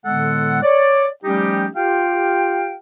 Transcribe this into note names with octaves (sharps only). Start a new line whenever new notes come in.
A2 D3 G#3 B3 A4 F#5
C#5 D5
F3 G3 A3 C#4 D#4 G4
F4 G4 F5 G5